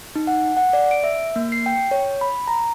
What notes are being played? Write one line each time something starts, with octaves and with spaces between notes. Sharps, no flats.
D#4
F#5
F#5
D5
D7
E5
A#3
C7
G5
C#5
B5
A#5